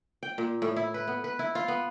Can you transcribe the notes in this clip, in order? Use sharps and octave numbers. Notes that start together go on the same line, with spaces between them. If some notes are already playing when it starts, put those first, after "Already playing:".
G5
A#2
A2
E4
B4
B3
B4
E4
F4
B3